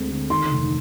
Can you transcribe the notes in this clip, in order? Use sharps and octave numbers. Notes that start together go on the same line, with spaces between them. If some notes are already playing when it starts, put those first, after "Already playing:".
Already playing: D2 G#3 C4
D3
D#3 C6
F1